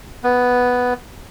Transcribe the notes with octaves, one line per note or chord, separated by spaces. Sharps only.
B3